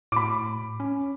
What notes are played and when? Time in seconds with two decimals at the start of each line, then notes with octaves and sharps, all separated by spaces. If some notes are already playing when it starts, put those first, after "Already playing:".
0.12 A2 B5 D6
0.80 C#4